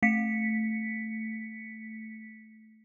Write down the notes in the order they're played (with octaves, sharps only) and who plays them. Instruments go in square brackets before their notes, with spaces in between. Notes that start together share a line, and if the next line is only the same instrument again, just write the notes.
[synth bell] A3 B6 C#7